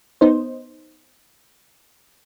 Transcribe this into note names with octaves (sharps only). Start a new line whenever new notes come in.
B3 D#4 C5